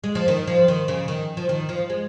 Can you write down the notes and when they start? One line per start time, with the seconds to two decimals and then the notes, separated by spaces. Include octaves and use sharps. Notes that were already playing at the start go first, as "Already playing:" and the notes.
0.04 G#3
0.15 F3
0.28 D#3
0.47 F3
0.68 D#3
0.88 C#3
1.08 D#3
1.37 F3
1.49 D#3
1.69 F3
1.90 G#3